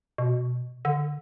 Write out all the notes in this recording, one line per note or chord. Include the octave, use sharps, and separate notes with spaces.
B2
D3